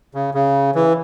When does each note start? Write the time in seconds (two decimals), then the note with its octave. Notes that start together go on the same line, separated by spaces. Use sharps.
0.14 C#3
0.34 C#3
0.75 E3